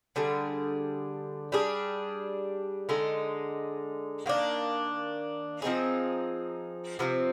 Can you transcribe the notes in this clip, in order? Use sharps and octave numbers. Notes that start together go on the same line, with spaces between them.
D3 G3 D4 G#4
G3 D4 G#4
D3 G#3 D#4
D#3 A#3 D4
F3 C4 D#4 G#4
C3 F3 C4